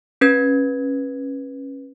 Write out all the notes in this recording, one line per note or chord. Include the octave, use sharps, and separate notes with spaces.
C#4 B4 G#6